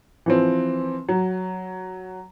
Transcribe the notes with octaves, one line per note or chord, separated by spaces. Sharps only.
E3 F3 C4
F#3